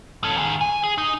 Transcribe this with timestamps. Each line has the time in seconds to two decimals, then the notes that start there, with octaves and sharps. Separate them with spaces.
0.24 C#4 A4
0.37 D#3 G#4
0.61 G#5
0.83 G#4
0.98 D#4